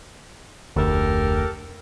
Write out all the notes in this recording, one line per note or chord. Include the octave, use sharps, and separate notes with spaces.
F1 D2 G4 A4 A#4